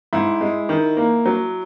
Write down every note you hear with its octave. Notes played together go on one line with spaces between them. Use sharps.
G#2 E4
G#3
D#3
A#3
F#3